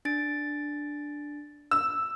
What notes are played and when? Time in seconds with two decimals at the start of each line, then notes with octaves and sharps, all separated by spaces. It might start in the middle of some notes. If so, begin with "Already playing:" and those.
0.05 D4 A6 D7
1.71 E6